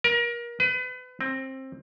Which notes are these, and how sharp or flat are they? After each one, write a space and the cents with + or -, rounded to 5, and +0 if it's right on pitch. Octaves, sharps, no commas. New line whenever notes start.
A#4 +30
B4 +30
C4 +20